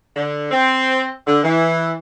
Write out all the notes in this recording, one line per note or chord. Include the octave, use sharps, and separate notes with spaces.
D3
C4
D3
E3